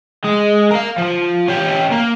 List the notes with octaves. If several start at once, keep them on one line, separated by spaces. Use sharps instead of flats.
G#3
A#4 F5
F3
C#4 G4
A#3